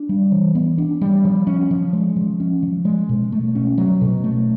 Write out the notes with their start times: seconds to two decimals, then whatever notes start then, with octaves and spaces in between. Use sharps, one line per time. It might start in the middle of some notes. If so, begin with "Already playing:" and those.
Already playing: D4
0.09 G3
0.32 E3
0.55 B3
0.78 D4
1.01 G3
1.25 F3
1.47 C#4
1.71 F3
1.93 G#3
2.16 F3
2.40 C#4
2.63 F3
2.85 G#3
3.09 B2
3.32 A3
3.55 C#4
3.78 F#3
4.01 B2
4.24 A3